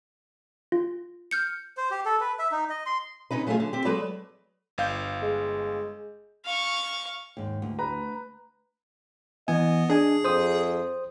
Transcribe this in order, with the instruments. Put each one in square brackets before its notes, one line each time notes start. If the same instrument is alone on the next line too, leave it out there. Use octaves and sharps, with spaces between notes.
[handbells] F4
[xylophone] F6 G6 C#7
[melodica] C5
G4
A4
B4
E5
D#4
D#5
C6
[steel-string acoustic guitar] C3 C#4 D#4 B4
F#3 A3 C#4 D4 F4 G#4
D3
C4 G4
F#3 G#3 A4 B4 C#5 D5
[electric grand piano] G1 F5 G6
[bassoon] G#3
[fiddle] F5 C#6
[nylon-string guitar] D#2 G#2
D2
[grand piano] B4 A#5
[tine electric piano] E3 G#5 [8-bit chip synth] B3 [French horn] D#5
[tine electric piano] D4 G#5 [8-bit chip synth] G#4
[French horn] F2 [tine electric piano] C5 D#6